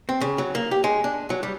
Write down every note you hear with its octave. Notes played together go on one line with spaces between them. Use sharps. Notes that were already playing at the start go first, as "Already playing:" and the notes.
C4
C#3
F#3
A#3
G4
G#3
D4
F#3
G3